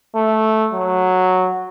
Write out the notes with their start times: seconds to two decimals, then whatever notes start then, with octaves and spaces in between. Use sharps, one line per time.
0.16 A3
0.73 F#3